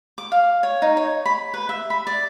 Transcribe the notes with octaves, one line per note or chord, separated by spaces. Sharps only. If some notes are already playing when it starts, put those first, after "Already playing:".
D6
F5
C#5
D#4
C#5
B5
B4
E5
B5
D5